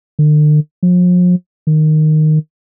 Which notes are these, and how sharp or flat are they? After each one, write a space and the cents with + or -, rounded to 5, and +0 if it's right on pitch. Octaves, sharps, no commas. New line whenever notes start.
D3 +45
F3 +40
D#3 -10